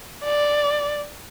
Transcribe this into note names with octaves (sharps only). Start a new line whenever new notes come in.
D5